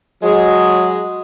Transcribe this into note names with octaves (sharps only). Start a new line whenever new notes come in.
F#3 G#3